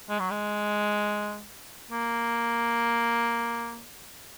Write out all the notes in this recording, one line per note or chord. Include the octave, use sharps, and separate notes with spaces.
G#3
F#3
G#3
A#3